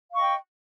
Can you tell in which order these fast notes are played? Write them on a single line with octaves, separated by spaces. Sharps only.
F5 C#6 D#5 G5